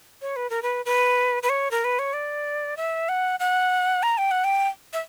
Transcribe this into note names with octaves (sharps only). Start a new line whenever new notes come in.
C#5
B4
A#4
B4
B4
B4
C#5
A#4
B4
C#5
D5
E5
F#5
F#5
A#5
G5
F#5
G5
E5